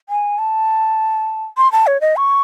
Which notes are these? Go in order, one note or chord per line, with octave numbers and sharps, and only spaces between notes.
G#5
A5
C6
A5
C#5
D#5
C#6